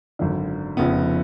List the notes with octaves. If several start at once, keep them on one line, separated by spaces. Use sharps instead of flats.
G#1 F#2 D3
F1 F2 C#3 F3 B3